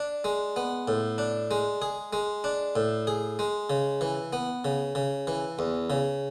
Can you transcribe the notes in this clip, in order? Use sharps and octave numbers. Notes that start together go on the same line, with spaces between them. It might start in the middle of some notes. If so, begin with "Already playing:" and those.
Already playing: D4
G#3
B3
A2
D4
G#3
G#4
G#3
D4
A2
G#4
G#3
C#3
E3
B3
C#3
C#3
E3
E2
C#3